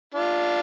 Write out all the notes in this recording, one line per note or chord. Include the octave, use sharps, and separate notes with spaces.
D4 F4